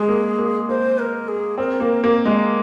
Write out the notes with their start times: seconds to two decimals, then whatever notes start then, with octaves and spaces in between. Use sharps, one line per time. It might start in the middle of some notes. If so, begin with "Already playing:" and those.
Already playing: G#3 G#4
0.09 A#3
0.38 A#3
0.69 A#3 C5
0.98 A#4
1.28 G#4
1.58 C4 A#4
1.80 A#3
2.04 A#3
2.26 G#3